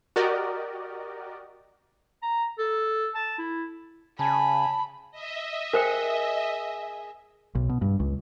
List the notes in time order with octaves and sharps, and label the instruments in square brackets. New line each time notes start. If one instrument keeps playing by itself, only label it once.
[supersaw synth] F#4 G4 A#4 D5 D#5
[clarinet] A#5
A4
A5
E4
[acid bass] C#3 [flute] G#5 [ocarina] A5 [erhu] B5
[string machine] D#5 E5
[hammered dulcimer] G#4 [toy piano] A#4 C5 G5
[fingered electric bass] B1
B2
G2
C#2